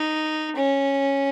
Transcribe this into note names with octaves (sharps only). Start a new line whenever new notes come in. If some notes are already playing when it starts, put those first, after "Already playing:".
Already playing: D#4
C#4